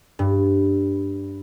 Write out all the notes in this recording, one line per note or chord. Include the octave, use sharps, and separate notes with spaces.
G2